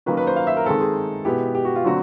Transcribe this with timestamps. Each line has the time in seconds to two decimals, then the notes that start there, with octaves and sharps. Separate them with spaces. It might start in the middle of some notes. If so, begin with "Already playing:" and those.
0.06 D#3 F#3 A#3 C#4 B4
0.17 B4
0.27 C5
0.36 F5
0.47 E5
0.57 A#4
0.65 D#3 G#3 C4 A4
0.81 G#4
1.25 B2 G#3 B3 E4 G4
1.55 G4
1.65 F#4
1.76 F4
1.84 D3 F#3 A3 C4 F#4